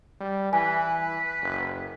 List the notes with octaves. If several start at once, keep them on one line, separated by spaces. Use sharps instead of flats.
G3
E3 B4 G#5
F#1